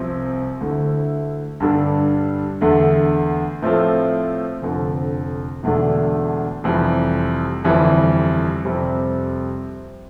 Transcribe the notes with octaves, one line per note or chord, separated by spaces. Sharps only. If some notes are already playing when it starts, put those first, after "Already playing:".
Already playing: C2 C3 F3 C4
D2 D3 A3 E4
G2 D3 G3 D4 A4
E2 D3 A3
A2 F3 C4 F4 A4
F1 F2 D3
E1 E2 D3 A3 D4
F1 F2 E3 G3
G1 F2 E3 G3
F2 C3 G3 C4